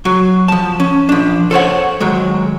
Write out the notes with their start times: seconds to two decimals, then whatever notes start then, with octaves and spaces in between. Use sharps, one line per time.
0.05 F#3 F#4
0.48 F3 A5
0.80 C#4
1.09 F3 D4
1.51 A4 C5 C#5 F#5
2.00 D#3 F#3 G#3